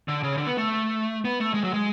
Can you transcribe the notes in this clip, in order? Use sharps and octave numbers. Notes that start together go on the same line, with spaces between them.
D3
C#3
D3
B3
A3
B3
A3
G#3
F#3
G#3